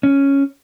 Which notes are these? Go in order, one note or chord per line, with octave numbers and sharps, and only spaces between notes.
C#4